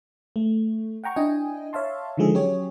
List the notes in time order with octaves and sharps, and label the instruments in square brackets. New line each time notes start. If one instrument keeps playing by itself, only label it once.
[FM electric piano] A3
F#5 G5 A#5 C#6
D4 E4 D#5 G5 G#5
C#5 E5 F5 A5 C6
D3 D#3 F3 G#3 G#4 A4
F#3 C#4 G4 G#4 C#5